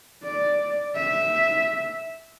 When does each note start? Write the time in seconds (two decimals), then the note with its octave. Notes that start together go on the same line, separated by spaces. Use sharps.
0.24 D5
0.96 E5